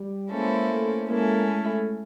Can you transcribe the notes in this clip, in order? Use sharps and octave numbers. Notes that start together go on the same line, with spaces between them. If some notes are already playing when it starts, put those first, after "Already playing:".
Already playing: G3
G#3 A#3 C#4 E4 A4 C5
A3
G#3 A#3 C#4 E4 A4
A3